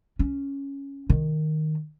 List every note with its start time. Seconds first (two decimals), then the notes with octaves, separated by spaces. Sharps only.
0.19 C#4
1.10 D#3